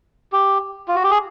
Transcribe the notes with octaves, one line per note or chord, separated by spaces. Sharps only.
G4
F4
F#4
G4
G#4